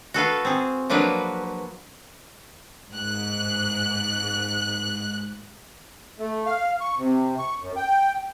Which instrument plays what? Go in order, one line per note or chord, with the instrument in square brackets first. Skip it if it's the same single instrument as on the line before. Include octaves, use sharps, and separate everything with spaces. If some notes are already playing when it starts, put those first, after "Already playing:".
[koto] F#4 A4 B4 F5
C4 G#4
F3 F#3 A#3 D4 B4
[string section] G#2 F#6
[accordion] A3
F5
C#6
C3
C#6
F#2
G5